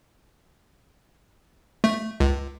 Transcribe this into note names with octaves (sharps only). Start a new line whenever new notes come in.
A3
C#2